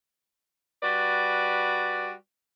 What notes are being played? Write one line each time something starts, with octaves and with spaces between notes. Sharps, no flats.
G3 F#4 B4 D5